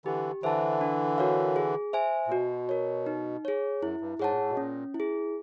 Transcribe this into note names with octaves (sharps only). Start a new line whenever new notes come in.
D3 E3 G4
D3 E3 C5 E5 A5
D4
F#4 A#4 C#5 F5
G#4
C5 E5 G#5
A#2
B2 F#4
A#4 C#5
D#4
G#4 C#5
F#2 E4
G2
G#2 G#4 C#5 F#5 A5
A#2
A2
B2
A#2 C#4
E4
G#4